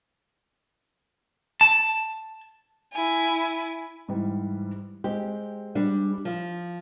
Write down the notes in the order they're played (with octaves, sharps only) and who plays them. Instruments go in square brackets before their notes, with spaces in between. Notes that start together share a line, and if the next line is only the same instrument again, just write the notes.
[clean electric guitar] A5
[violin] E4 G#5
[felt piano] G#2 E3 G3
[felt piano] G#3 C4 [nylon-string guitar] G4
[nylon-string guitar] G3 D4
F3